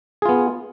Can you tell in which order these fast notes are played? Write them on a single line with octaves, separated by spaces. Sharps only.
G#4 F4 B3